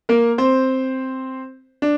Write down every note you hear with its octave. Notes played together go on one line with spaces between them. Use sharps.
A#3 A#4
C4 C5
D4